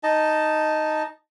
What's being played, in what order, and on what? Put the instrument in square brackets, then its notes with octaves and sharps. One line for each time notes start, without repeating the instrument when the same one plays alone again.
[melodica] D#4 D#5 A5